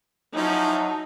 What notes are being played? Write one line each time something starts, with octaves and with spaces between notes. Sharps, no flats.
F3 F#3 C#4 D#4 E4 A5